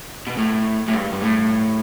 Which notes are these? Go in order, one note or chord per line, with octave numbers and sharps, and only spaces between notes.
B2
A2
A2
G2
G2
A2